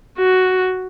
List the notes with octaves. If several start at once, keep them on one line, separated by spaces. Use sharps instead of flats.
F#4